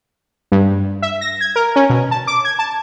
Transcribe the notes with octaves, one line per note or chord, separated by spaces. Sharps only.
G2
E5
A#6
G#6
A#4
C#4
B2
A5
D6
G#6
A5